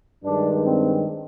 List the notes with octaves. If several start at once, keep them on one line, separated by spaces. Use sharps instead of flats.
G2 D#3 G#3 D4
C4